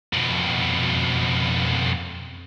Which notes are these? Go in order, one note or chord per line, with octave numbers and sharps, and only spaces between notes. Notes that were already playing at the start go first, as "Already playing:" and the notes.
F2 B2